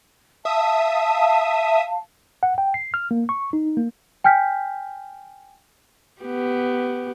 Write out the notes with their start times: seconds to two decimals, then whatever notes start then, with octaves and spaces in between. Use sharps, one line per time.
0.45 E5 F5 A5 D#6
2.43 F#5
2.58 G5
2.74 C7
2.94 F6
3.11 A#3
3.29 C#6
3.53 D#4
3.77 A#3
4.24 G5 G#5 F6 G6 B6
6.22 B3 G4